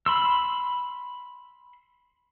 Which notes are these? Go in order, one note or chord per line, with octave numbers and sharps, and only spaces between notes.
B5 C6 E6